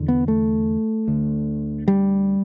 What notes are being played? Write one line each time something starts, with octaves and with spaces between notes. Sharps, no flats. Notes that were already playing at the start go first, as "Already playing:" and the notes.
Already playing: E2 D3
B3
A3
D2 D3
G3